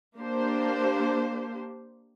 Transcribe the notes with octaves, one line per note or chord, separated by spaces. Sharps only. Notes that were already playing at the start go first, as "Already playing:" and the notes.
A#3 D4 G4 C5